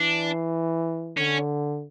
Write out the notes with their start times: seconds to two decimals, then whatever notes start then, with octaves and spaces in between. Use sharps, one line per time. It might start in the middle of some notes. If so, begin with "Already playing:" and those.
Already playing: E3 D4
1.18 D3 C#4